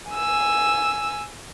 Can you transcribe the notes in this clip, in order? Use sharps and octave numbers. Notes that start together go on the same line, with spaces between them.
G#5 E6